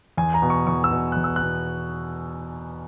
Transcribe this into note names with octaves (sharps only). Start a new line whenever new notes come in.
E2 G#5
A#5
B2
C#6
E2 C#6
E6
B2
E2 F#6
E6
F#6
B2